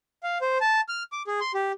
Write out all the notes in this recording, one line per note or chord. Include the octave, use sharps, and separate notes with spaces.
F5
C5
A5
F6
D6
G#4
C6
G4